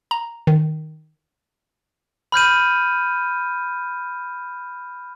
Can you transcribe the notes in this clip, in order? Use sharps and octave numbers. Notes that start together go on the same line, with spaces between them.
A#5
D#3
B5 F6 G6 D#7